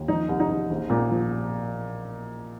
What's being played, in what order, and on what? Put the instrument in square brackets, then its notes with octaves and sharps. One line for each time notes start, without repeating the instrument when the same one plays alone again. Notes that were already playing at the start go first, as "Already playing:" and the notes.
Already playing: [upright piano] D#2
F3 D#4
C2
D#4
C2
A#1
A#2
F3